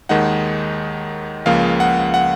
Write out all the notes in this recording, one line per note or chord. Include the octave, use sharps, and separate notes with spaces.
D#2 D#3 G#3 D#4 F#5
C#2 C#3 F3 A#3 F5
F#5
F#5